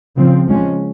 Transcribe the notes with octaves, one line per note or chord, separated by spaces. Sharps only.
C#3 F3 C4
F3 G#3 C#4